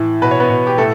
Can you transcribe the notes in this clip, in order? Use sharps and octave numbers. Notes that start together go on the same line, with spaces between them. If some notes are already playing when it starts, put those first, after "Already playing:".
Already playing: A2 E3
B2 B4
C#5
B3 B4
B2
G4
A2 A3 A4